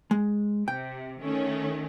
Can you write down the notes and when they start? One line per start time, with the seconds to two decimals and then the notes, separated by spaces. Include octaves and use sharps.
0.11 G#3
0.68 C3 G5
1.21 D#3 A3 C#4